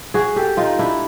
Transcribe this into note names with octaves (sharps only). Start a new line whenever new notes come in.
F#4 G#4
G4 A4
D#4 F4
D4 E4